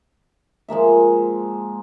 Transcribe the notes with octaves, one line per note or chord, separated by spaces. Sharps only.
F3 G#3 A#3 E5